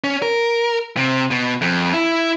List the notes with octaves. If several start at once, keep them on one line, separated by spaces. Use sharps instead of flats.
C#4
A#4
C3
B2
F2
E4